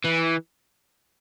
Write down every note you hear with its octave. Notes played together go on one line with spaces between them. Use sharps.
E3